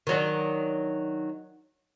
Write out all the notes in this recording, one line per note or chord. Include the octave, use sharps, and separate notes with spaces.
D#3 F#3 D4